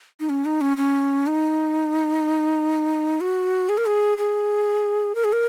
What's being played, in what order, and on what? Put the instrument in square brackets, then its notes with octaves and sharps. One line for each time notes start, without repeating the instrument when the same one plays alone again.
[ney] D#4
C#4
D#4
C#4
C#4
D#4
F#4
G#4
A#4
G#4
G#4
A#4
G#4
A#4